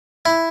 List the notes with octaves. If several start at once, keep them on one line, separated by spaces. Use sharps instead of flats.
E4